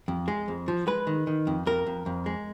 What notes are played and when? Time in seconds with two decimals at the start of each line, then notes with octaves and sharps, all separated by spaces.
0.08 F2
0.28 G#3
0.48 F2
0.68 F3
0.87 G#3 B4
1.07 D#3
1.27 D#3
1.47 F2
1.66 F2 A#4
1.86 F2
2.06 F2
2.26 G#3